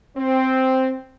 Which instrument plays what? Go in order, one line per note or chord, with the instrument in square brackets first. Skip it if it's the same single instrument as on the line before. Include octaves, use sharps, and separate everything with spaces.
[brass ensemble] C4